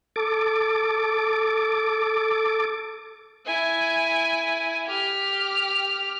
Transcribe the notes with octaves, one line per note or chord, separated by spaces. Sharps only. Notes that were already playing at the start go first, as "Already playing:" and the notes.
A4 D6
E4 G#5
G4 F6